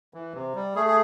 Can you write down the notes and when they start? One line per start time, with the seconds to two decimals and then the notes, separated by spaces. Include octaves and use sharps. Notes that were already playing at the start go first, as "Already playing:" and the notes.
0.14 E3
0.34 C3
0.55 G3
0.76 A3 G#4
0.88 G#4